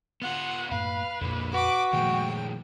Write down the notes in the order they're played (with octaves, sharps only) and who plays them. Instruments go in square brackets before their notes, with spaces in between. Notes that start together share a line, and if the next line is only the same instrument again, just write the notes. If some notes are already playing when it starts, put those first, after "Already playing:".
[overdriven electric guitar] B3 F4 [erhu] F#5
[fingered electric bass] F#2 A2 A#3 [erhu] B4 [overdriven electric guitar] F5
[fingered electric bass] F2 A#2 [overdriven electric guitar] D3 A#3
[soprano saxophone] F#4 [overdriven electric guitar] B4 [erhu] D6
[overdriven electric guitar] A#2 G#3 [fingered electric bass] D#3 F3 A3 [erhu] G5